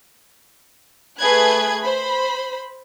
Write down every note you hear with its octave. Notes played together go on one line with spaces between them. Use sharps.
A3 G#4 B4 B5 F#6 G#6
C5 B5